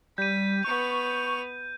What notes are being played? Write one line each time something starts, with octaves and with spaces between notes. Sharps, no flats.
G3 G6 B6 D#7
B3 C#6 F7